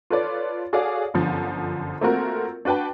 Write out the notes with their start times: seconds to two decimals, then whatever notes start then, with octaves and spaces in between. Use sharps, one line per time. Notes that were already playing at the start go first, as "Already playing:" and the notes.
0.10 F4 A4 B4 C#5 D5
0.73 F#4 G#4 A4 C#5 D5 F5
1.14 G1 F#2 D3 F3
2.01 A3 A#3 C4 F4 F#4 A#4
2.65 D4 F#4 B4 G5 A5